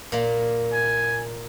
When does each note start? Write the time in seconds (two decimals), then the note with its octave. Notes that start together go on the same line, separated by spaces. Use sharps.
0.12 A#2 A#3
0.73 G#5